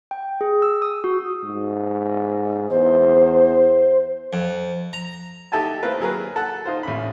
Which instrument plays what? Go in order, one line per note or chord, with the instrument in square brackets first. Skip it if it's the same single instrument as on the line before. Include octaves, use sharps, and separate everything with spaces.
[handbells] G5
G#4
E6
D#6
F#4
[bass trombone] G#2
[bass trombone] E2 [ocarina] C5
[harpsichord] F2
A#5
[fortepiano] D#4 G4 A4 E5 G#5 A5
A3 C4 E4 F4 A#4 B4
F#3 G#4 A#4 B4
A4 F#5
D#4 F4 C5
A1 C#4 B5